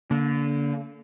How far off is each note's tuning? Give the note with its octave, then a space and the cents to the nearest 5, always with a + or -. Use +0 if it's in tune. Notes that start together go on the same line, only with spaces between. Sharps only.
D3 -30 A#3 +0